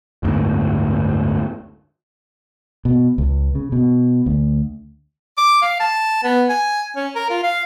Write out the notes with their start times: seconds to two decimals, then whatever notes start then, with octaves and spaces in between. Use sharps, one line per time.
0.23 F#1 D2 G#2
2.85 B2
3.18 C#2
3.55 C#3
3.72 B2
4.26 D2
5.37 D6
5.62 F5
5.80 A5
6.23 B3
6.49 G#5
6.96 C#4
7.15 A#4
7.30 F4
7.43 F5